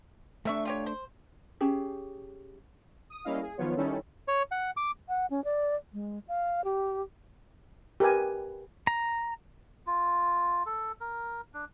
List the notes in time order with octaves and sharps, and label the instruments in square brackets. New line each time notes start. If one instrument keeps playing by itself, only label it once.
[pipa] C3 E5 C#6 [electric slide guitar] A3 D4
[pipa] F4 G4 C#5
C5
[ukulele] C#4 G4 G#4
[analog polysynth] D#6
G3 A#3 C#4 E4 D#5 F5
G#4
D#3 F3 F#3 B3 F4 C#5
D#3 G3 C#4 D#4 E4 A4
[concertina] C#5
F#5
D6
[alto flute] F#5
C#4
D5
G#3
F5
G4
[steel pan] G4 A#4 B4 G#5
[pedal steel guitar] A#5
[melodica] F4
A4
A#4
D4